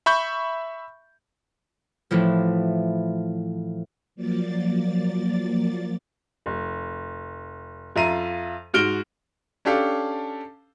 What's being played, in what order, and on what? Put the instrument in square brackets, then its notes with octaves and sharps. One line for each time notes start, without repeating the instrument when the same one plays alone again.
[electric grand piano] E5 B5 C#6 G6
[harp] A2 E3 F3
[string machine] F3 F#3 A#3 D5 A6
[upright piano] F1
F2 F4 E5 F5 A#5 D#7
G#2 F#4 F6 D7 G7
[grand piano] C#4 D4 G4 A4 F5